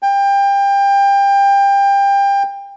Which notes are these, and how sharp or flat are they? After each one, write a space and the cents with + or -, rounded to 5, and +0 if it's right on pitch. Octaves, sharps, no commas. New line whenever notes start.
G5 +25